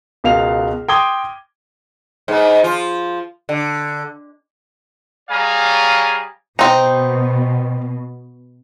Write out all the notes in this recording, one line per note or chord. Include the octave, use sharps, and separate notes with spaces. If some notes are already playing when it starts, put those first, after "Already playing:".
C#2 B2 A#4 F5 F6 F7
G5 C6 D6 D#6 G#6 G7
G#2 B3
F3 F4
D3
G3 G#4 C#5 F5 G#5 A#5
B2 C4 D#4